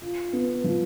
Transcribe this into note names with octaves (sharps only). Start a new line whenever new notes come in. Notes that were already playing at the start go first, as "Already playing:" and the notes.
F4
B3
F3